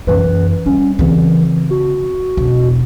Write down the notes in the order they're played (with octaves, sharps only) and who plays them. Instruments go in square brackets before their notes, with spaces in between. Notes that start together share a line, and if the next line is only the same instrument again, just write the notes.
[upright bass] F#2 E3 [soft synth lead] B4
[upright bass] G3 [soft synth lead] C#4
[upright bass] C#3 C4 [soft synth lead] E3
[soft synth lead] F#4
[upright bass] E1